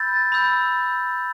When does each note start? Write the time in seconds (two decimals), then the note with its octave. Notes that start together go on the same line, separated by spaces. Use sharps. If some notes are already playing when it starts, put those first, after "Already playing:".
Already playing: B5 E6 G6 A6
0.32 B5 E6 G6